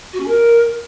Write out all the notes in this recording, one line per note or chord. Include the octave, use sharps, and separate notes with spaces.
F#4
C#4
A#4